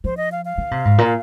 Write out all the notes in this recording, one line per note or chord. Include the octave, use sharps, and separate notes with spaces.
F3 C5
D#5
F5
F5
D#3
C3
G#2
A#2